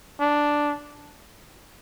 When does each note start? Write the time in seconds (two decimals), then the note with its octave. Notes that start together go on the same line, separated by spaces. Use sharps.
0.20 D4